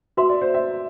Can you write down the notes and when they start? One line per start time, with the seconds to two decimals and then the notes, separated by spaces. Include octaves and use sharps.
0.17 F#4 B4 E5 F#5 C6
0.29 D5
0.41 C5
0.54 E5